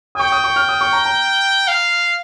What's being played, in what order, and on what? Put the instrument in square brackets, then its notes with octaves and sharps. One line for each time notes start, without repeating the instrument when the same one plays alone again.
[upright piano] D#6
[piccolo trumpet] G5 [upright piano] C#6
[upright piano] D#6
C#6
F6
D#6
C#6
A#5
A#5
[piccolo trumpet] F5